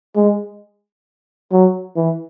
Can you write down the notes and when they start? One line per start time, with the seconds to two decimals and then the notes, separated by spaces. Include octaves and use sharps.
0.16 G#3
1.52 F#3
1.96 E3